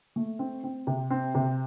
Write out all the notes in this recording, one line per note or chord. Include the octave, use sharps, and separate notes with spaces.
A3
C4
C4
C3
C4
C3